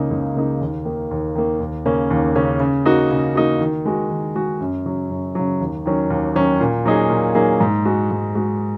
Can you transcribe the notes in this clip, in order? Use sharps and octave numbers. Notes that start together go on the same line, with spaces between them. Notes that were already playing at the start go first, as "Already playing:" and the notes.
Already playing: C#2 C#3 A#3 D#4
C#2
C#3 A#3 D#4
D#2
D#3 A#3
D#2
D#3 A#3
D#2
C#3 A#3 C#4
D#2
C#3 A#3 C#4
C#3
A#3 D#4 F#4
C#3
A#3 D#4 F#4
D#3
G#3 F#4
D#3
G#3 F#4
F#2
C#3 F#3
F#2
C#3 F#3
D#2
D#3 F#3 C#4
D#2
D#3 F#3 C#4
A#2
F#3 A#3 D#4 G#4
A#2
F#3 A#3 D#4 G#4
G#2
G#3 F#4
G#2
G#3 F#4